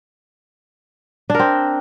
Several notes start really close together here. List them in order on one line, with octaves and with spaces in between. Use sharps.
D4 A#4 C4